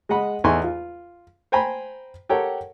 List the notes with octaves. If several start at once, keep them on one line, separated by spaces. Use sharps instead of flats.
G#3 D#5 F#5 B5
E2 D#4 A4 G#5 C6 C#6
F4
C5 G5 G#5 A#5 B5
G4 A4 A#4 C#5 F#5 G5